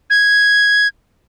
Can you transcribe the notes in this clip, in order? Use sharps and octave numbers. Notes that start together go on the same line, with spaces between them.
G#6